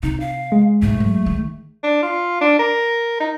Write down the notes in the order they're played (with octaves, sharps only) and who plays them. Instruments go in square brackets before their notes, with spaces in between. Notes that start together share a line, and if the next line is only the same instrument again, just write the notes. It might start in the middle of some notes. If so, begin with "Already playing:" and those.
[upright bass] C3 [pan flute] D#4
[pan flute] F5
[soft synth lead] G#3
[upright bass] B1 G#2 [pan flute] A3
[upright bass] F#2
D#3
[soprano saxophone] D4
F4
D4
A#4
D#4